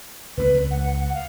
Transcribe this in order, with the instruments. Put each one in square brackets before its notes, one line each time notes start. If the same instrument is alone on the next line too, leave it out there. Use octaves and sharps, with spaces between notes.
[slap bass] C#2 G3 C4 [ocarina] B4
[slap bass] C#2
[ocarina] F#5
F#5
F5